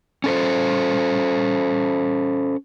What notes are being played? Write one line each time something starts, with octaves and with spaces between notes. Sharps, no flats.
C#4 A4 C5